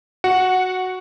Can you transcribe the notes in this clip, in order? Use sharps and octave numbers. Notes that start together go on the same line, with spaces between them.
F#4 F#5